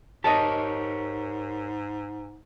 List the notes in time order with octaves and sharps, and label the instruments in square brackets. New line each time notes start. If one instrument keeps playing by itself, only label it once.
[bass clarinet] G#2 [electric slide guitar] G4 A#4 C#5 [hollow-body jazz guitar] D#5 A5